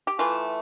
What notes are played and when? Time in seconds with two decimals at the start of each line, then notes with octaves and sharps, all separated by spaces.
0.07 G4
0.19 E3 A3 F4